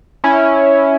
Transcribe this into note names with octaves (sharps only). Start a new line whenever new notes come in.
C#4 E4